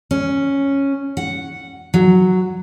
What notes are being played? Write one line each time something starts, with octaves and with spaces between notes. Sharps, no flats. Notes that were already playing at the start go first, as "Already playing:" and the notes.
C#4
F#5
F#3